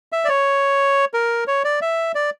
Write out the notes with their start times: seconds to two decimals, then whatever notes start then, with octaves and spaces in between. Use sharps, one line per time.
0.12 E5
0.25 D5
0.29 C#5
1.14 A#4
1.47 C#5
1.64 D5
1.82 E5
2.15 D5